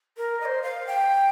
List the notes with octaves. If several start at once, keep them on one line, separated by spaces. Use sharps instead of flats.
A#4
D#5
C5
F5
G5